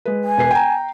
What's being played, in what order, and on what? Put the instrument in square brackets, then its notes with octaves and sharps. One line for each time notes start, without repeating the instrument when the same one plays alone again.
[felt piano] G#3 B4
[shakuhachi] G#5
[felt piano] E1 B4 C7
G5 A#5